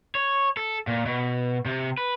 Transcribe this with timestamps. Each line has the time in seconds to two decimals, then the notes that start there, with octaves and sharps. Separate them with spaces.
0.15 C#5
0.57 A4
0.87 A#2
1.06 B2
1.65 C3
1.98 B4